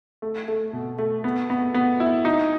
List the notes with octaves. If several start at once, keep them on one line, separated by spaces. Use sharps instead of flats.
A3
A3
B2
A3
B3
B3
B3
E4
D#4